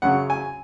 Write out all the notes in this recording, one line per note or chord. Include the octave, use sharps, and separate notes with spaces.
F#2 C#3 F#3 F#5
G#5